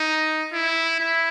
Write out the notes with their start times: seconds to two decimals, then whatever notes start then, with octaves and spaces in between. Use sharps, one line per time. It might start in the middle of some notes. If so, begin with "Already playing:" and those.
Already playing: D#4
0.53 E4
1.00 E4